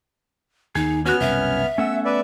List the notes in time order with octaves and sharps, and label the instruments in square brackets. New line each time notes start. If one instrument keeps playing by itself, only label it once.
[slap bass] D#2 [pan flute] D#4 [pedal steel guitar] G#4
[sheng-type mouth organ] B3 F6 [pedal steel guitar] C#4 F#6 [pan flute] F#4
[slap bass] C2 F#2 B2 [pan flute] E5
[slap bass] A3 B3 [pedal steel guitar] C#4 A4 F#5 [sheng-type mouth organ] E6
[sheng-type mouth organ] B4 D5 E5